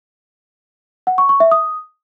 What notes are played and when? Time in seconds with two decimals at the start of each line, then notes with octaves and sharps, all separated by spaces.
1.07 F#5
1.18 C#6
1.29 C#6
1.40 E5
1.51 D#6